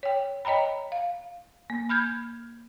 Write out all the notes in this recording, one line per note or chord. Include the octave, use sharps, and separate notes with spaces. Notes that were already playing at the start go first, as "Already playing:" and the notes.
C#5 G5
C#5 D#5 G5 A#5 B5
F5
A#3
B5 F6 G6 G#6